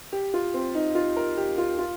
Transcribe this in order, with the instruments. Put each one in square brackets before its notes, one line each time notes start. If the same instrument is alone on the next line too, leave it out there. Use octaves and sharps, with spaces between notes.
[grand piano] G4
F4
C4
D#4
F4
A#4
G4
F4
F4